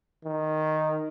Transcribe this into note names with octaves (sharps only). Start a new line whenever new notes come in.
D#3